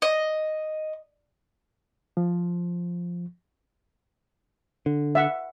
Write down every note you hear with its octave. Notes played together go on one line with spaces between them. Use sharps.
D#5
F3
D3
E5 F#5